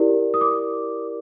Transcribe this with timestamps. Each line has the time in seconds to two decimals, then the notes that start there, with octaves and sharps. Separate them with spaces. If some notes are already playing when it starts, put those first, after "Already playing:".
Already playing: E4 G4 A#4 D5
0.34 D#6
0.41 D6